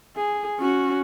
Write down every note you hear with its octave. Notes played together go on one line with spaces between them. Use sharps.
G#4
C#4 F#4